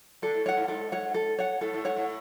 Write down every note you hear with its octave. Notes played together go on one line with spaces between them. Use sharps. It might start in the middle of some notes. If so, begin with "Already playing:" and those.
D3 A4
A2
G#2 C#5 F#5
A2
G#2 A4
C#5 F#5
A4
C#5 F#5
A2 A4
A2
G#2 C#5 F#5
A2